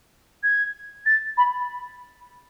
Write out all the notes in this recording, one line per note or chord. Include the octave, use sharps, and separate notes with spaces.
G#6
A6
B5